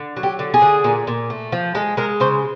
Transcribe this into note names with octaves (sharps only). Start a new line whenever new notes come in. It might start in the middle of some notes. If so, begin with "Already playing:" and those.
Already playing: D3
F#3
G4
D3
G#4
D3
A#2
A#2
A3
F3
G#3 A4
G#3 A#4
C#3 C5